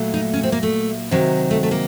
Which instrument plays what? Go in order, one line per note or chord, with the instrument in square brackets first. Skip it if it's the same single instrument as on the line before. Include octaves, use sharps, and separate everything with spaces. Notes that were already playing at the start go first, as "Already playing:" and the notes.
Already playing: [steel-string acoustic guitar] A#2 F#3 A3
D#4
C#4
C4
A#3
A3
C3 D#3 F#3
A3
A3
A#3